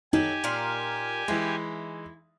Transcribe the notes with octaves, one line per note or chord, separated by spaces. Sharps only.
F#3 D#4 G4 A4 G#5
A#2 A#4 D5
E3 G#3 E4